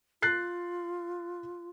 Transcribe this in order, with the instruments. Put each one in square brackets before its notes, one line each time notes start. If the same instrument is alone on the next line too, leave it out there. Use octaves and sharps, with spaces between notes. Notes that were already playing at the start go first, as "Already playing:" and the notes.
[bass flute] F4 [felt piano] F#6 A6 C7